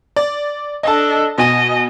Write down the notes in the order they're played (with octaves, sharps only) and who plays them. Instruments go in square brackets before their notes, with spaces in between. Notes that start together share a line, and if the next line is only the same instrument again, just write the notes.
[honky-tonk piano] D5
[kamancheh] D4 A4 [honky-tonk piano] D#5 A5
[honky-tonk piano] B2 G#5 D#7 [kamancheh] D#5